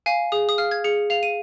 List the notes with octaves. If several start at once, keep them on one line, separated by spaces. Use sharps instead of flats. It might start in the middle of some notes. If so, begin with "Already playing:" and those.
F5 G#5
G#4 D#6
D#6
F5 F6
G#6
G#4 C#7
F5 F7
D#7